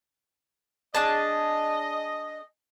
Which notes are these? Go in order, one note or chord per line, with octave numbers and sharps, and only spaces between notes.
D4 G#4 D#5 A5